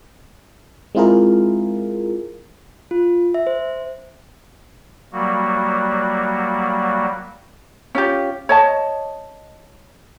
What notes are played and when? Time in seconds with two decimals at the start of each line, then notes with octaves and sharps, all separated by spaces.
0.95 G#3 C4 E4 F4 G#4 A#4
2.91 F4
3.34 E5
3.47 C5
5.13 F#3 G3 A#3 F#4
7.95 C#4 F4 G4
8.49 C#5 D#5 A5